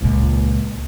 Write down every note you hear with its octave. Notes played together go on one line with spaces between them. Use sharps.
C#2 A#2